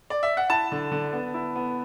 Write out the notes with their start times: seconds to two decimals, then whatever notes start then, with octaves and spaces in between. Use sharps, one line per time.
0.10 D5
0.23 E5
0.37 F#5
0.49 E4 A5
0.72 D3
0.92 D3
1.13 B3
1.34 E4
1.56 B3